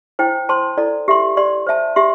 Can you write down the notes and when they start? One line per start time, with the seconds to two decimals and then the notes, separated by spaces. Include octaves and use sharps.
0.19 E4 C5 G5
0.49 C5 A5 C6
0.77 E4 A4 D5
1.08 G4 E5 C6
1.37 G4 D5 C6
1.67 C5 E5 A5
1.96 G4 E5 C6